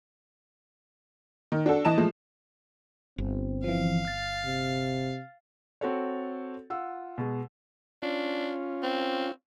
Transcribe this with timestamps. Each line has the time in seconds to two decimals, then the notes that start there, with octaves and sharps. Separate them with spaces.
1.52 D#3
1.66 D4 F#4 A4
1.85 E3 D#5 A5 E7
1.98 F3 G#3 A3
3.18 G1 C4
3.64 E3 F3 F5
4.05 F6 A6
4.45 C3
5.81 C4 F#4 A4 C#5
6.70 F4 F#5 E6
7.18 B2 G#3
8.02 C#4 D4 F4
8.83 C4